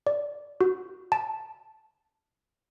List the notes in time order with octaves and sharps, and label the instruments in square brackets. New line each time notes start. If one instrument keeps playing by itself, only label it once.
[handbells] D5
F#4
A5